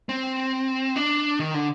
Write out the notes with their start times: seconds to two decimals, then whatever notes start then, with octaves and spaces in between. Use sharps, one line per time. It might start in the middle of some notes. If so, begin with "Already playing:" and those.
0.09 C4
0.96 D4
1.39 D#3
1.54 D3